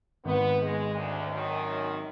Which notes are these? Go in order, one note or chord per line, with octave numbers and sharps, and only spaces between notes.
G#1 B3
G#3
D2
F#2 D#3